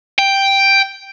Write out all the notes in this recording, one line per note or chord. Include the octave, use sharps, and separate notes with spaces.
G5